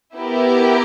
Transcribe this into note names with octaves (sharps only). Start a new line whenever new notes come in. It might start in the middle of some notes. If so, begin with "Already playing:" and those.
B3 E4 G4 A#4